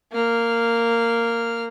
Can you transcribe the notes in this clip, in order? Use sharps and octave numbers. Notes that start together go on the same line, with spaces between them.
A#3 F6